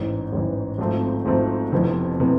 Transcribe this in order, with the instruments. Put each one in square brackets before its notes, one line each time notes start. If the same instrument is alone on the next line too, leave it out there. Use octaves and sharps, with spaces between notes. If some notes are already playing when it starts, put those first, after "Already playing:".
Already playing: [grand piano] A1 G#2 E3
A1 G#2 E3
G#1 G#2 F3 A3 C4
G#1 G#2 F3 A3 C4
F1 F2 C3 E3 B3
C3 E3 B3